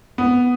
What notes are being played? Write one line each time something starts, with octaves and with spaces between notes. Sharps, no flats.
B3